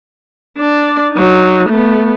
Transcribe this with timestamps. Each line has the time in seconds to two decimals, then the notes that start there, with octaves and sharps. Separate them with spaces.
0.58 D4 D5
1.13 F#3 D#4
1.69 A3 B3